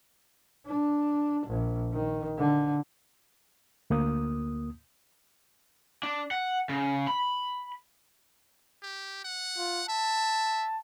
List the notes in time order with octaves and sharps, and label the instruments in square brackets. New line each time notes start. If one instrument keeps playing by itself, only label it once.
[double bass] D4
A#1
D#3
D3
[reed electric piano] D2 A#3 D#6
[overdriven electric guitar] D4
F#5
C#3
B5
[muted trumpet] G4
F#5
[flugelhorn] F4
[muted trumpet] E5 [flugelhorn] A5